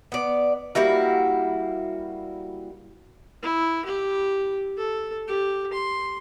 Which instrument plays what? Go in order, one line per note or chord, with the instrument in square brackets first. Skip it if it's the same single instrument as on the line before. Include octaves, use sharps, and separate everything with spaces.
[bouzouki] B3 D5
G3 A#3 E4 F#4
[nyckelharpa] E4
G4
A4
G4
C6